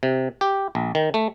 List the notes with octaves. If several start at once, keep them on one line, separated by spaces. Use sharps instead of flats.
C3
G4
A#1
D#3
A3